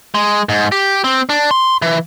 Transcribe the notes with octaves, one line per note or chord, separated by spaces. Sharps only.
G#3
G#2
G4
C4
D4
C6
E3